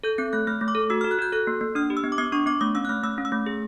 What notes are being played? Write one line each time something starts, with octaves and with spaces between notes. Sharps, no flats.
A4 G6
C4 G6
A3 F#6
A3 F6
A3
D6
A4
F#4 E6
F6
F#4
F#6
F#4 G6
A4 F#6
A#3
A#3
D4 F6
G4
E6
B3
D6
B3 D#6
D4 C#6
B3 D6
A3 D#6
C#4 E6
F#6
A3 F6
A3 E6
C#4
E6
A3
G#4